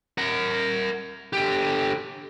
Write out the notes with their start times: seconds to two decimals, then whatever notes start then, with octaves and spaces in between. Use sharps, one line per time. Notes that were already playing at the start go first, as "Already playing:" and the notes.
0.18 A#4 F#5
1.33 D3 G4